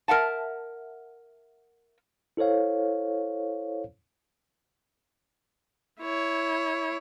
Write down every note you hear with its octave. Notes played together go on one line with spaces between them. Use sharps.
A#4 E5 F#5 A5
E4 A4 C5 C#5 F5
E4 C#5